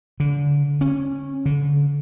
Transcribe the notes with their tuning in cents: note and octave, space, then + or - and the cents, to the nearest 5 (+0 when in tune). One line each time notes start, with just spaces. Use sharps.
D3 -30
C#4 -15
D3 -35